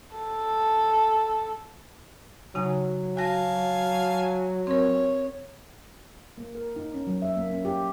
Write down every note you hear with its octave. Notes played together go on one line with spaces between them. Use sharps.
A4
C#3 F#3 D#4 G#5
F#4 F5 G#5 A5 A#6
C4 A#4 C#5
A#3
A#4
D#4
C#4
F#3
E5
A#3
C#4
G4